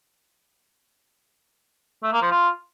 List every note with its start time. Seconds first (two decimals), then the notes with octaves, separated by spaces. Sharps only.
2.03 A3
2.12 A#3
2.22 F3
2.31 F4